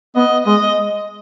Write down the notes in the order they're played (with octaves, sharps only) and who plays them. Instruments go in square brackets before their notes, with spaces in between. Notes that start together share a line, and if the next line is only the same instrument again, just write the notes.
[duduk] B3 [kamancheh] D#5
[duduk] G#3 [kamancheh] D#5